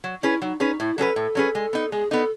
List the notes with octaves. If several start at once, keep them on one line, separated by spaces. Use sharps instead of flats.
F#3
C#4 E4 G#4 B4
F#3 D#4
C#4 D#4 G#4 B4
A2 E4
F#3 C#4 G#4 A4 B4
A2
F#3 C#4 G#4 B4
G#3
B3 D#4
G#3 G#4
B3 D#4 A4